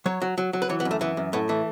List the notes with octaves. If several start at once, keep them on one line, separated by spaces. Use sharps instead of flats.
F#3 C#5
F#3
F#3
F#3
B4
E3 C#5
B3
F#2
A3
E3 B3
F#2
A2 B3
E3 A3